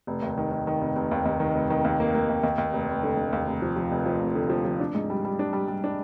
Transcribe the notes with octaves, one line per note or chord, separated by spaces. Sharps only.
F1
D#2
D#3
D#3
D#3
F1
F1
D#2
D#2
D#3
F1
D#3
D#2
A#3
A#3
D#2
D#2
D#2
F1
F1
D3
D3
D#2
F1
F3
F3
F1
F3
F1
D3
F3
F3
D4
G#2
G3
G3
D4
G3
G3
D4